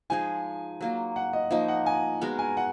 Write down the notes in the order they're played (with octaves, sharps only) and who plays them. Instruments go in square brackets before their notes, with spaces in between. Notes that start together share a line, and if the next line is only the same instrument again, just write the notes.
[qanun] F3 G#3 D#4 G#4 [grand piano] G#5
[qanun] F#3 A#3 F4
[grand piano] F#5
D#5
[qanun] F3 A#3 D#4 [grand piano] D#5
[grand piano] F#5
G#5
[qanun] G#3 B3 F#4 A#4
[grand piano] G#5
F#5